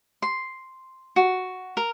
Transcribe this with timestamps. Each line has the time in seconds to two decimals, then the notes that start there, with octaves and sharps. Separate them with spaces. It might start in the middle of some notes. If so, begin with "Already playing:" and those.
0.22 C6
1.16 F#4
1.77 A#4